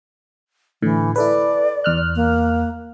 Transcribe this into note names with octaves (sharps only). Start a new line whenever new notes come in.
A2 D3 E3
E4 A4 B4 D5
E2 F6 F#6
A#3